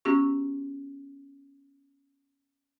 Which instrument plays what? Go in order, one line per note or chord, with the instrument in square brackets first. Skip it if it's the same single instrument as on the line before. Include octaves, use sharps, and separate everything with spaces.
[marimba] B3 C#4 F#4 G4 C#6